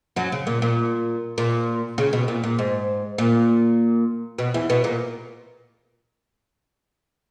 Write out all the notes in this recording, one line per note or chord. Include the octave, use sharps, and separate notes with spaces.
F#2 F#3
C#3
A#2
A#2
A#2
C#3
B2
A#2
A#2
G#2
A#2
B2
E2 E3
B2 B3
A#2 A#3